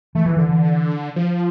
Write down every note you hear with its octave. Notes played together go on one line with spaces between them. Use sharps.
E3 A3
E3 F3
D3 E3
E3
F3